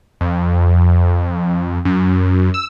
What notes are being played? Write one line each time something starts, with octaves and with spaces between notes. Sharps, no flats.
F2
F#2
E6